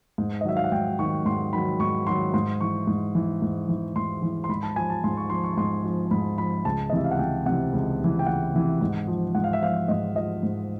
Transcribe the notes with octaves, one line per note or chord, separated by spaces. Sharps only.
G#2
D#5
D#3 F#3 E5
F5
F#5
G#2 G5
D#3 F#3 C#6
G#2 C6
D#3 F#3 B5
G#2 C#6
D#3 F#3 C6
G#2 C6
E3 C#6
G#2
E3
G#2
E3
G#2 C6
E3
C6
G#2 B5
A5
F3 G#5
A5
G#2 C6
C#6
F3 C6
C#6
G#2 C6
F3
G#2 B5
F3 B5
C#2 A5
D#5
C3 E3 E5
F5
F#5
C#2 G5
C3 E3 F#5
C#2
C3 E3
G5
C#2 F#5
C3 E3
G#2
F3
G#2 F#5
F5
E5
F3 F5
G#2 D#5
F3 D#5
G#2